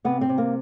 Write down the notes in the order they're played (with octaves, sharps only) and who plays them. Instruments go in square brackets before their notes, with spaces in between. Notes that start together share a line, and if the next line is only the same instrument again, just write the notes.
[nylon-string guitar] C3 B3
C4
C3
A#3